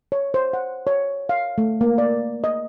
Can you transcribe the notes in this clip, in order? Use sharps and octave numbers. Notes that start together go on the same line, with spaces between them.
C#5
C5
F#5
C#5
F5
A3
A#3
D5
D#5